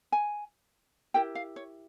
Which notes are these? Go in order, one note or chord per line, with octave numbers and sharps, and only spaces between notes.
G#5
E4 G4 A#4 G5
F5
C#5